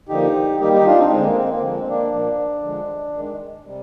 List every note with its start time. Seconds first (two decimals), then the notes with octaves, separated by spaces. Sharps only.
0.09 D3 F3 A#3 D#4 G4
0.60 D#3 G3 A#3 D#4 G4
0.72 D#4 G4
0.86 D4 F4
0.98 C4 D#4
1.11 D3 G#3 C4
1.23 A#3
1.36 C4
1.48 A#3
1.61 D3 F3 G#3 C4
1.87 A#3 D4
2.12 A#2 F3 A#3
2.62 D3 F3 G#3
3.14 D#3 G#3
3.65 C3 G3